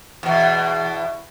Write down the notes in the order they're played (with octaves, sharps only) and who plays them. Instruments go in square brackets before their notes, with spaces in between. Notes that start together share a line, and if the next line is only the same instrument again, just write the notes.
[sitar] E2 B2